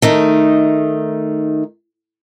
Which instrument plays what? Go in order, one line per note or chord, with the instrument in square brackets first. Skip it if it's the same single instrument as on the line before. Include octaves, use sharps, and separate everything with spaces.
[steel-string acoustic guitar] D#3 A3 D#4